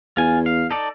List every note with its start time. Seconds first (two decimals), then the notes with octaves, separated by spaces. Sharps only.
0.17 E2 F4 G#5
0.46 F5
0.71 D#4 A4 D5